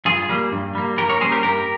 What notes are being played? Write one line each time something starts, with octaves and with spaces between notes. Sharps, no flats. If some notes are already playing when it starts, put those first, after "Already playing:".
G2 F4 G#4
G3 A#3
G2
G3 A#3
G2 G4 A#4
A#4 C#5
G3 A#3 C#4 G#4 C5
G4 A#4
G2 G4 A#4